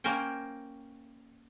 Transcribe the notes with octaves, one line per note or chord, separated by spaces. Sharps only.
A#3 C#4 A#4 C5 G5